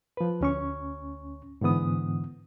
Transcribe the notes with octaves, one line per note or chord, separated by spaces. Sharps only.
F3 B4
D2 C#4 C#6
G#2 D3 E3 B3 D#6